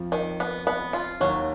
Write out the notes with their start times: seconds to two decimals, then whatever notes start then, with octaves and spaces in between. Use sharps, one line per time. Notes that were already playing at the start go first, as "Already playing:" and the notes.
Already playing: F2 F3
0.12 D#3
0.40 B3
0.67 B3
0.93 F4
1.20 D#2 D#3 F#3